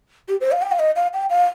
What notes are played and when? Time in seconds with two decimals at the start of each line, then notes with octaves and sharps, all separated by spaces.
0.28 G4
0.40 C5
0.52 F5
0.62 G5
0.72 F5
0.79 D#5
0.96 F5
1.13 G5
1.30 F5